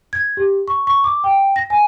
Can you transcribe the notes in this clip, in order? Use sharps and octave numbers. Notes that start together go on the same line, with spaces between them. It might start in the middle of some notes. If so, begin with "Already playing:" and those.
G#6
G4
C#6
C#6
D6
G5
A#6
G#5